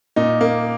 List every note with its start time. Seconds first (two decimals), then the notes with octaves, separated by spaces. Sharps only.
0.16 A#2 D#4
0.41 A#3